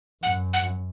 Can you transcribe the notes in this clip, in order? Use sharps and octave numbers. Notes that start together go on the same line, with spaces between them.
F#2 F#5
F#5